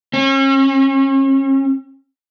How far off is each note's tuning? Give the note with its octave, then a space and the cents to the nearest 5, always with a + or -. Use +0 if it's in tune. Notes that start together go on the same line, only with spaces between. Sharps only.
C#4 -40